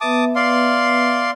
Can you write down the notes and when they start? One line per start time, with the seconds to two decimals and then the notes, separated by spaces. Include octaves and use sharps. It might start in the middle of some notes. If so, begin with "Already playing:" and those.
0.01 B3 B4 E5 A5 D6 D#6
0.35 D5 F5 C6